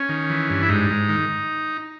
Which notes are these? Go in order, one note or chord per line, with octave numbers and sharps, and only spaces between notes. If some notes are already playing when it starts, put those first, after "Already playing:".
Already playing: C#4
D#3
E3
G2
E4
G#2 D#4
G#2
D#3